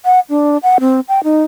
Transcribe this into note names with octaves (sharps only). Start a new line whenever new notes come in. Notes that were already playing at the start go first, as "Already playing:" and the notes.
F#5
D4
F#5
C4
G5
D#4